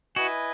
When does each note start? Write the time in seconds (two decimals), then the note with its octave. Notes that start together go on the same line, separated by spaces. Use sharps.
0.16 E4 F#4 B4 D#5 G#5